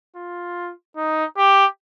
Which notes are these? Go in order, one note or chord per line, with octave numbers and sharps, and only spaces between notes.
F4
D#4
G4